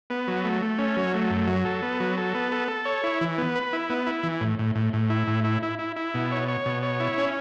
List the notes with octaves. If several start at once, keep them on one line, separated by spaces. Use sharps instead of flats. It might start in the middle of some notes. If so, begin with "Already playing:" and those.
B3
F#3
A3
A3
C#4
F#3
A3
F#2
F#3
A4
B3
F#3
A4
B3
A4
A4
C#5
E4
E3
B3
B4
E4
B3
E4
E3
A2
A2
A2
A2
E4
A2
E4
E4
E4
E4
B2
C#5
C#5
B2
C#5
E4
C#4